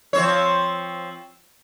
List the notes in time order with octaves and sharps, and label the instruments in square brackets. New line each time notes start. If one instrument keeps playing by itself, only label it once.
[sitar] F3 C4 C#5